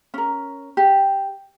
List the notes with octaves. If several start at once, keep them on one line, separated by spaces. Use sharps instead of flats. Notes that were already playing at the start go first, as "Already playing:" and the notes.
C#4 A#4
G4